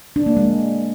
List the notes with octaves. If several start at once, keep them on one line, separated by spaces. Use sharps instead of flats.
D4
A#3
G#3